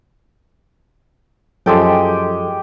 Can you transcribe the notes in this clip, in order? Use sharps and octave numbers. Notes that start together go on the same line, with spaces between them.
F#2 F3 G#3 G4 A4 G5